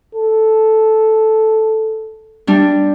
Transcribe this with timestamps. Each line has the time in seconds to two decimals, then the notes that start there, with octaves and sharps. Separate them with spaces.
0.15 A4
2.47 G3 D4